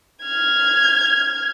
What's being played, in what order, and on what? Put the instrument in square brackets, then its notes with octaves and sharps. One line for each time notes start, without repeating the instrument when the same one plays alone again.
[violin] F6 G#6